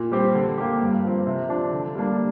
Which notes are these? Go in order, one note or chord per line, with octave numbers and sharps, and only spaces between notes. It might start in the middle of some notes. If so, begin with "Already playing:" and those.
Already playing: A#2
G3 C4 G4
D3
A#3 G4
G2
F3 C4
C3
F3 D4
D3
G3 A#3 D4